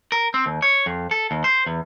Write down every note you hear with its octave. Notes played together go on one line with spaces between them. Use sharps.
A#4
C4
D#2
C#5
F2
A4
D#2
C5
E2